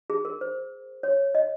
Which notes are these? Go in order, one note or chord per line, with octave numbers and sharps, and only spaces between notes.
G#4
A#4
C5
C#5
D#5